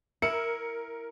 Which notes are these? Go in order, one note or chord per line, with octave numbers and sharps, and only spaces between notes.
E4 A#4 C#7